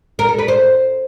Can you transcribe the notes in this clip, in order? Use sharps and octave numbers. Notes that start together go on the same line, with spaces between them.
A#4
A4
B4
C5